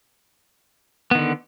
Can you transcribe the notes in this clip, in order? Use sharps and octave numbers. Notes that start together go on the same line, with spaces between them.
D3 D#3 B3